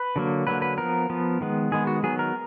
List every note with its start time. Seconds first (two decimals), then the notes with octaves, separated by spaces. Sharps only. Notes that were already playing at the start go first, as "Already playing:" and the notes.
Already playing: B4
0.16 D3 F#3 A#3
0.47 D3 F#3 A#3 B4
0.62 B4
0.77 F3 B3 A#4
1.10 F3 B3
1.41 D#3 G#3 B3
1.72 D#3 G#3 B3 G#4
1.87 F#4
2.03 D#3 F#3 B3 G#4
2.19 A#4